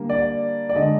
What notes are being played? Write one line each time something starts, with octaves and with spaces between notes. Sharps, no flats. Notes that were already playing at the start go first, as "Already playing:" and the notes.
Already playing: D3 G3 A#3
D5
D5
D3 G#3 D#5